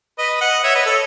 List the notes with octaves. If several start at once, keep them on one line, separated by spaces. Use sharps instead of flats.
B4 D#5
D#5 F#5
C#5 E5
B4 D#5
A4 C#5